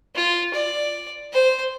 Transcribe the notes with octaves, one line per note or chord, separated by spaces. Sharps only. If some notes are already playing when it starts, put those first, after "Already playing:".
F4
D5
C5